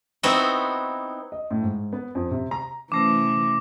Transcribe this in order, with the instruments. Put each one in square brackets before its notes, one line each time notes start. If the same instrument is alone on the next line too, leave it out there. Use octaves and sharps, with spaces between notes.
[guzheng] B3 C4 D#4 E4 F#4
[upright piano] D#5
A2
G#2
B3
F2
C3
A#5
[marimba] C3 A3 C#4 [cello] E3 [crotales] D6 A#6